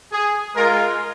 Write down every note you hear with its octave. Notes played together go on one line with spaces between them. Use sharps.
G#4
G#3 F4 A#4